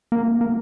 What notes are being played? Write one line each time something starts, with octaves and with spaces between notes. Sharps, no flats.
A#3
A#3